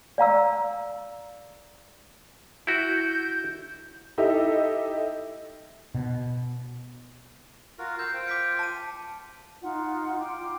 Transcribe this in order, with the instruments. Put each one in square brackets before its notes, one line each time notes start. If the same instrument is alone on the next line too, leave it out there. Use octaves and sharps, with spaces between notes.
[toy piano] D5 F5 A#5 E6
[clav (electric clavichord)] E4 F#4 [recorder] G6
[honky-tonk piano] D#4 E4 G4 A4 D#5 E5
[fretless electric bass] B2
[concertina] F4 F#4 A#4
[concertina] A#4 F5 E6 [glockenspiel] G6
[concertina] F4 C5 G5
[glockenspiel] D6 B6 C#7
A5 D#7
[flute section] D#4 F4 F#5
F4 G5 C6 D6